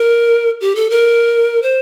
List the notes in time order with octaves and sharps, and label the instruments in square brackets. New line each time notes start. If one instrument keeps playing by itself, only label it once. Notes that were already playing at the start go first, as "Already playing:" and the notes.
Already playing: [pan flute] A#4
G4
A4
A#4
C5